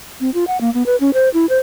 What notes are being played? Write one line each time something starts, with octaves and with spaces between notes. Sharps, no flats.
C4
F4
F#5
A#3
B3
B4
C#4
C5
E4
C5